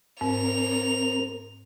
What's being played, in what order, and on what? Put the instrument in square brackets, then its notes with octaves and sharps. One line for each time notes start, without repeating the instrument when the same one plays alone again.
[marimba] G#2 [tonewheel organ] C4 A#4 [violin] F7